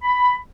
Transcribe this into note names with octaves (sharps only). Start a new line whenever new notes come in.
B5